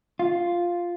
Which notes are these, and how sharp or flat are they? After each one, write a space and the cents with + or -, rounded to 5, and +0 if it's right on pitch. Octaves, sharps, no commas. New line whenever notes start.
F4 +0